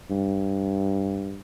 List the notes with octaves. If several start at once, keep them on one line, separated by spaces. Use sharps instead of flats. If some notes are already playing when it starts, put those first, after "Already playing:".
G2